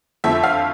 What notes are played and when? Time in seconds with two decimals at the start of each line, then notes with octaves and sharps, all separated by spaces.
0.24 F2 D3 F3 A3 E5
0.44 F5